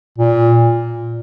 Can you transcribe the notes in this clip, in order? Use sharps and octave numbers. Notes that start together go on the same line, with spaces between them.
A#2